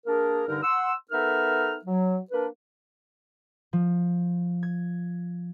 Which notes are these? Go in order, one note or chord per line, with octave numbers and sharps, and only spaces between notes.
A#3 D4 G#4 A#4
G2 D3 D#4 A#4
F#5 C6 E6
B3 D#4 A4 A#4 E5 F6
F#3
A#3 D4 A#4 B4
F3
G#6